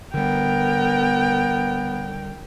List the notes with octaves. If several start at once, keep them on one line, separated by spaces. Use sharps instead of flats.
D3 G3 B3 A#4 G5